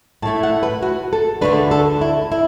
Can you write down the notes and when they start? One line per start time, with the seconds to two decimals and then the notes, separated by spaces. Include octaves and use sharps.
0.22 A2 A5
0.25 A3 E4
0.43 F#5
0.63 B4
0.82 F#4
1.13 A4
1.41 D2 D3 A3 D4 B4
1.71 A4
2.01 E4
2.32 E4